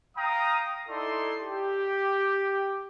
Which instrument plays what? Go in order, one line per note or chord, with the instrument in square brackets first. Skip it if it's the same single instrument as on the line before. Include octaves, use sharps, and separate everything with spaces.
[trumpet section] F5 G5 A#5 D#6
D#4 E4 A4 D5 C6
G4